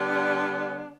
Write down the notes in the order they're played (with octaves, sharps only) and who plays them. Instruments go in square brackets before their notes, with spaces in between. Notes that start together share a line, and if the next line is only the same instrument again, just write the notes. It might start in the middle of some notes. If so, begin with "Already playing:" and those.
Already playing: [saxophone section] D3 G3 B3 D4